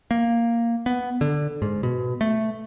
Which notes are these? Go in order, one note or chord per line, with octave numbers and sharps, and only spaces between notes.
A#3
B3
D3
G#2
B2
A3